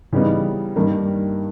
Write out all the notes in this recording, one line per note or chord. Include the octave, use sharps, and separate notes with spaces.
C#3 E3 G3 B3 D#4
G2 D#3 G3 A#3